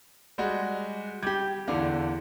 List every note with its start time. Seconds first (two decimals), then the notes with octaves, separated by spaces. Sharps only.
0.38 G3 G#3 F#4
1.23 G3 G4 G#6
1.68 E2 D3 E3 D4 F5